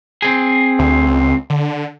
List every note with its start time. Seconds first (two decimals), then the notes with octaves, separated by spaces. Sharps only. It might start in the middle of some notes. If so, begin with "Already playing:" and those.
0.22 C4 G#4
0.79 D2
1.06 C#2
1.50 D3